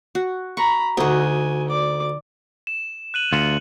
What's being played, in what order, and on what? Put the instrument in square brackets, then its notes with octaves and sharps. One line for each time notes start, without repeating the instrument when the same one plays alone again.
[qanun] F#4
[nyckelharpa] A#5 B5 [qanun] C#6
[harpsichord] D2 [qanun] D#4 F#4 [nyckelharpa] G#5
[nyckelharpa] D5 D6
[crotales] E7
F#6 D#7 F#7
[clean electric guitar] D2 F4 [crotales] C#7 F#7